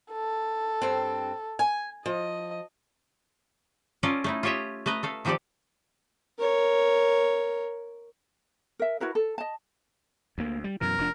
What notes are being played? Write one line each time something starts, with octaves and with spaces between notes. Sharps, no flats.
A4
G2 C4
G#5
F3 D#5
C#4 F4 A4 A#4 D5 D#5
A3 D#4 E4
F4 G4 C#5 D#5 E5
A3 B4 D#5 A#5
A3 A4 F5
D#3 F3 C4 G4 A4 D5
A#4 C#5
A#4 E5
E4 F#4 A#4 B4
A4
D#5 A5
D2 A#3
G3
F#2 B2 E3 A#4
F1 F3 D4